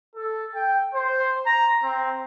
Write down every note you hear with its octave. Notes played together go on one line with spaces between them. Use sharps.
A4
G5
C5
A#5
C4